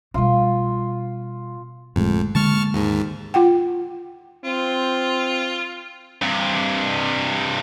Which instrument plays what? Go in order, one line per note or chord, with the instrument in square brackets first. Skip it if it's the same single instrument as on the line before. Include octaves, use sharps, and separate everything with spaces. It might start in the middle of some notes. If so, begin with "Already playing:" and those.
[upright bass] B2 G3 [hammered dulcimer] F4
[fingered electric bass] G1 A2 G#3 [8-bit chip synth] F2
[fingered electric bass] D3 G#3 A#3 [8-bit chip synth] A5 C#6 F6
[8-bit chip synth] D#2 G#2
[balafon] F4 F#5 G5
[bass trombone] C4 [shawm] F4
[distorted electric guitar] G2 C3